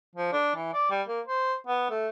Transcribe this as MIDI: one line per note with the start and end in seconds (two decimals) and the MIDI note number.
0.15 0.32 53
0.32 0.55 62
0.56 0.70 52
0.73 0.90 74
0.90 1.02 55
1.08 1.20 58
1.26 1.53 72
1.67 1.88 59
1.90 2.08 57